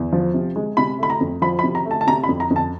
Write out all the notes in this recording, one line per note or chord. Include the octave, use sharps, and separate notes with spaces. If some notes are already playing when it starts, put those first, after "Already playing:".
Already playing: E2
F3
C3
G#3
C3 B5
A3 B5
A#5
F2
F3 B5
B5
C3
A#5
A3
A5
A5
C3 A#5
B5
F2
A#5
F2
A5